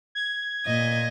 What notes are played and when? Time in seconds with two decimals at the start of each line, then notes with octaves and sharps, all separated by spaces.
0.15 G#6
0.66 A#2 D#5